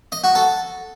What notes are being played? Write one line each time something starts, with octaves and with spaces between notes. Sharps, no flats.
D#5
F#4
A4